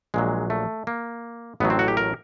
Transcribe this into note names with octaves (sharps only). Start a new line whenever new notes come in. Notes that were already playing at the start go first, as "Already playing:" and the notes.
A#1 A#2 F#3 G#3
A3
A#3
A1 A2 F#3 B3
C4
F#4
G4
A#4